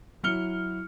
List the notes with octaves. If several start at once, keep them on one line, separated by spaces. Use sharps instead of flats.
F#3 E4 F6 C#7 G7